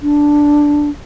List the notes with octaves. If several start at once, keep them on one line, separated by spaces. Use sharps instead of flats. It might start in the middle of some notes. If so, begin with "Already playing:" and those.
D4